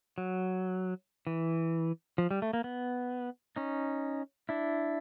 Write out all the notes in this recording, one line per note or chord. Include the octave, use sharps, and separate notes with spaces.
F#3
E3
F3
G3
A3
A#3
B3
C#4 D#4
D4 E4